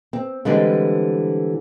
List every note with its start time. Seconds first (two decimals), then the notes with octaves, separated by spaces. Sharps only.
0.13 C4
0.45 D3 E3 G3 G#3 C4